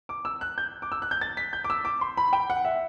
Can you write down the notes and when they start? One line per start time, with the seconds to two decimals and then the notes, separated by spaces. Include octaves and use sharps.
0.09 D6
0.25 E6
0.41 F#6
0.58 G6
0.82 D6
0.92 E6
1.02 F#6
1.11 G6
1.21 A6
1.37 B6
1.53 G6
1.64 D6
1.70 E6
1.85 D6
2.01 C6
2.17 B5
2.33 G5
2.50 F#5
2.65 E5